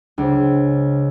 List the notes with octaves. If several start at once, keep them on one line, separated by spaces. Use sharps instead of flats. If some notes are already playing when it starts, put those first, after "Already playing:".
C#2 D4 G#4 C5